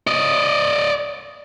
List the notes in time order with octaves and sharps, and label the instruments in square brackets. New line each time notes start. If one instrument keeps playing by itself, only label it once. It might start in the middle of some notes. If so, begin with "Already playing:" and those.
[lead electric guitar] D5 D#5